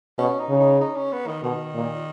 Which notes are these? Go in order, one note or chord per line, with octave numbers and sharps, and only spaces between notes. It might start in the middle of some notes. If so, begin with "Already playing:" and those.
B2 C#4
D#4
C#3
D#4
D#4
C#4
B3
D#3
B2 D#3
A#2